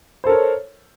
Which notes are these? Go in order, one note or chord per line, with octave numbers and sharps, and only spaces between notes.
A4 A#4 C5 C#5